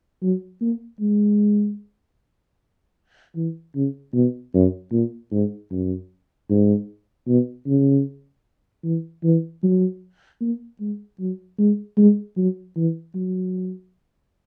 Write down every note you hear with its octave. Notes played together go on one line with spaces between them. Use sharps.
F#3
A#3
G#3
E3
C#3
B2
F#2
A#2
G#2
F#2
G#2
B2
C#3
E3
E3
F#3
A#3
G#3
F#3
G#3
G#3
F#3
E3
F#3